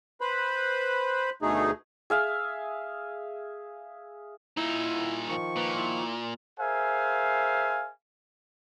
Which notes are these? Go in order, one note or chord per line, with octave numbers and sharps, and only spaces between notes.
B4 C5 B5
D2 B2 A3 D#4 G#4
G#4 E5 F5
A#2 D#4 E4
D#3 F3 C#6
A#2 B4
E4
G#4 A#4 C5 E5 F5 G#5